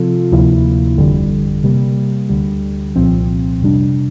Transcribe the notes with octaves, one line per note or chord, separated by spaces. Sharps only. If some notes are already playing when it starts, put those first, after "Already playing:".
Already playing: C3 F3 C4 F4 A4
D2 C3 F3 A#3 E4
G1 F2 D3 G3
C3 G3 A#3
D2 D3 G3
C2 A#2 F3 C4
F2 C3 G3 D4